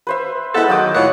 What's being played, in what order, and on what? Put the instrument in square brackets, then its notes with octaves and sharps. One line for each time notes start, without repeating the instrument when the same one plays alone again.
[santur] B4 C5 E5
[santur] G#3 F#5 [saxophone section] B3 E4 A4
[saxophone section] D#3 F#3 [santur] D#5 G5 D6
[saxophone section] A2 F4 F#5 [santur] C#5 D#5 E5